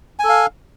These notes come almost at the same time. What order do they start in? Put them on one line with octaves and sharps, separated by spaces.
G#5 A4 F5